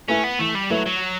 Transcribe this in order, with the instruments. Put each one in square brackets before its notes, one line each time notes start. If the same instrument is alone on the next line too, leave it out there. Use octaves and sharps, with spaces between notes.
[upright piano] A3 E4 B4 E5 [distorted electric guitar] C#4
[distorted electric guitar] B3
[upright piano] E3 [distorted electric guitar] A3
[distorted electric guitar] G3
[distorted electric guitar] F#3 [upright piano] A3 E4 B4 E5
[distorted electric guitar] F#3